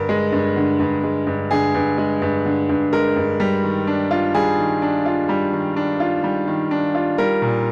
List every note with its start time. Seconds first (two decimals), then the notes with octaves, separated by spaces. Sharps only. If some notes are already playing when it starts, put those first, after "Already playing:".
Already playing: G2 D3 A#4
0.09 G#3
0.32 G2
0.57 D3
0.80 G2
1.04 G#3
1.27 G2
1.51 D3 G#4
1.74 G2
1.98 G#3
2.22 G2
2.46 D3
2.69 G2
2.93 G#3 A#4
3.16 G2
3.40 G3
3.64 D#3
3.87 D4
4.11 F4
4.35 G3 G#4
4.58 D#3
4.82 D4
5.06 F4
5.29 G3
5.53 D#3
5.76 D4
6.00 F4
6.24 G3
6.47 D#3
6.71 D4
6.95 F4
7.18 G3 A#4
7.42 A#2